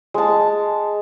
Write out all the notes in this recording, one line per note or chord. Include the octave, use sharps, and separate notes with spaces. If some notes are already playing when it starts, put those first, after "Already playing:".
G#3 A5